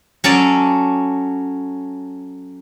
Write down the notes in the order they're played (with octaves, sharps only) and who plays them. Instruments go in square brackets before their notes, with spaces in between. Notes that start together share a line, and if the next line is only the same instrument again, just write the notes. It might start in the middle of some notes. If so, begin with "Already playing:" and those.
[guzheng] F#3 C#4 A4 D5